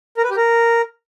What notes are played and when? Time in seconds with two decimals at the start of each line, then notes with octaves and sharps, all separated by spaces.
0.17 A#4
0.24 B4
0.30 G4
0.37 A#4